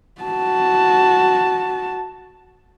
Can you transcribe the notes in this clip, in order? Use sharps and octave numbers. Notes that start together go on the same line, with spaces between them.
F#4 A5